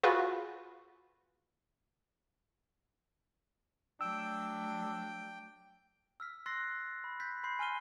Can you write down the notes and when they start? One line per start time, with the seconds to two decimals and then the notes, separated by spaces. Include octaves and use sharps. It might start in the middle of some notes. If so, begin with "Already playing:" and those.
0.03 F4 F#4 G#4 B4
4.01 F#3 A3 D4 G5 E6
6.20 E6 F6 B6
6.46 C6 E6 F#6 A6 A#6 C7
7.04 B5
7.20 F#6 G6 A6 B6
7.44 B5 C6 G6 C7
7.59 G#5 C6 F6 D#7 G7